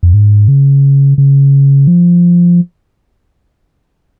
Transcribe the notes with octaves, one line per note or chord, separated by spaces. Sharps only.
F2
G#2
C#3
C#3
F3